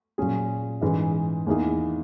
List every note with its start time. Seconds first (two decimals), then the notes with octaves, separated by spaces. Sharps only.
0.18 A#2 F#3 C#4 G#4
0.81 G#2 E3 G#3 C#4
1.47 E2 D#3 A#3 E4 G#4